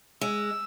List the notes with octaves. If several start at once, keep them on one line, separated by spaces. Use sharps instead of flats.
G#3 E6